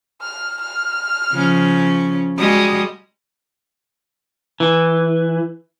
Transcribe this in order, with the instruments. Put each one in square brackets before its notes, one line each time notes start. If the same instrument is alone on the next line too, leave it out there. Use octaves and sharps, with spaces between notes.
[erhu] F6
F6
[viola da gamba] C#3 F3 C#4
[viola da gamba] G3 G#3 F#4 [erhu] D#6
[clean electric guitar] E3